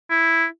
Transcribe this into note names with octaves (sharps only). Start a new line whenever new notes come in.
E4